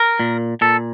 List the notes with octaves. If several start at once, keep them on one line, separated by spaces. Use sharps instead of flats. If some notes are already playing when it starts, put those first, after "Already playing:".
Already playing: A#4
A#2
A#2 A4